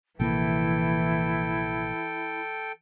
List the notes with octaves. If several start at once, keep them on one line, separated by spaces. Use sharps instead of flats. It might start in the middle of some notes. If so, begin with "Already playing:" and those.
A#1 C3 E3 A#3 E4 A4 G5